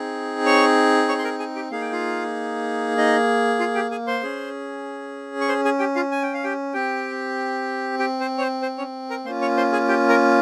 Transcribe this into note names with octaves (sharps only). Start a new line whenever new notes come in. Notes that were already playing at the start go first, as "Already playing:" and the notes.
Already playing: C4 D#4 G#4
C#5 C#6
C#5 C#6
C6
A#4 A#5
G#4 G#5
G4 G5
A#3 D#4 G#4 F5
G5
F4 F5
D#4 D#5
F4 F5
G4 G5
G#4 G#5
C5 C6
C#4 G#4
C#6
C5 C6
G#4 G#5
G4 G5
F4 F5
G#5
G5
F5
G4 G5
C4 G4 G5
G4 G5
C5
C#5
C5
C5
C#4 C#5
A#4 A#5
A#3 C#4 F4 C5 C6
C#5 C#6
C5 C6
G#4 G#5
G4 G5
A#4 A#5